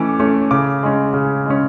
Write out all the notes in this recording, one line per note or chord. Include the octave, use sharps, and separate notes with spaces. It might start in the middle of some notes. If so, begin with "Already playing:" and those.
Already playing: E3 A3 C#4 D6
A3 C#4
C#3 D6
G#3 C#4
C#3
G#3 C#4